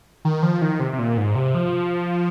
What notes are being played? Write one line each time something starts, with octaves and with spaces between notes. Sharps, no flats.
D#3
F3
D#3
C3
C3
A#2
G#2
C3
F3